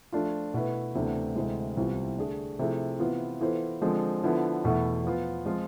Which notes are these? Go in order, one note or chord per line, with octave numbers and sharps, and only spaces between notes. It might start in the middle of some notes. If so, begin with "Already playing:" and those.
F3 A3 D4 F4
B2 A3 E4 B4
D2 C3 E3 B3 D4
D2 C3 E3 G#3
C2 C3 E3 B3 F4
D3 A3 D4 G#4
C3 F3 A3 E4 G#4
C3 E3 B3 F4
E3 B3 F4 A4 C5
D3 F3 G#3 C4
D3 F3 B3 E4
E2 B2 A3 E4
F3 B3 F4
F3 G#3 C4 F4